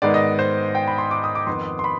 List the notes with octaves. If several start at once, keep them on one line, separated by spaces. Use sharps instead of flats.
G#2 D#3 G#3 B3 D#4 D5
D#5
C5
G5
B5
C6
D6
D#6
D6
F2 D#3 B3 C6
C6
B5